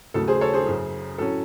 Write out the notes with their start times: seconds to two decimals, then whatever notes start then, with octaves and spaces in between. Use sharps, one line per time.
0.14 D#2 C#3 F#3 A3 A4
0.28 G#4 C5
0.41 A4 C#5
0.54 G#4 C5
0.67 F#2 C#3 F#3
1.18 A2 F#3 C#4 A4